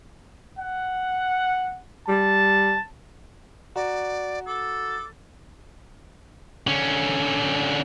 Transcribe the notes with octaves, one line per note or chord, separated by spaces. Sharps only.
F#5
G3 A5
F#4 D5 A#5
A4 D6
D3 C#4